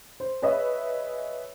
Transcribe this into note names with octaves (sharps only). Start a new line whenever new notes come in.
C5
G#4 B4 C#5 D#5 E5